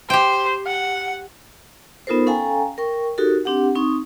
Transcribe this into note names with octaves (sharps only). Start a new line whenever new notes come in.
G4 C5 G5
F#5
B3 D#4 F4 A4 A#4 C5
C#4 A4 F5 G5 G#5 A#5
A#4 G5 C#6
D#4 F#4 G4 A4 A#4
C4 D4 G4 F#5
C4 D#4 C#6 D#6